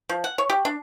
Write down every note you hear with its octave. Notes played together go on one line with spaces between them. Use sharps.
F3
F#5
C#5
G4
D4